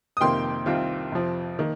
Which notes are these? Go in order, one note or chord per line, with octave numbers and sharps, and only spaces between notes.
D#6
F2 C3 D#3 A#3 G5 C6
C2 C3 D#3 C4 F4
F2 C3 F3 C4
D#3 A#3